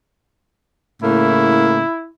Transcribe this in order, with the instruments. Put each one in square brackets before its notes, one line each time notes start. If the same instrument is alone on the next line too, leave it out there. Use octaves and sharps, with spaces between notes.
[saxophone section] A2 C#3 A#3 [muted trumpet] E4